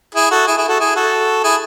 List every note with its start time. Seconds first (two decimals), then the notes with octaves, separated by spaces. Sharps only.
0.15 E4 G#4
0.31 F#4 A4
0.47 E4 G#4
0.58 E4 G#4
0.68 F#4 A4
0.80 E4 G#4
0.96 F#4 A4
1.44 E4 G#4